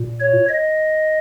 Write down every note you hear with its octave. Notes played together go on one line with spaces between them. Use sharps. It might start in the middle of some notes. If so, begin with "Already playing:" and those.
Already playing: A#2
C#5
D#5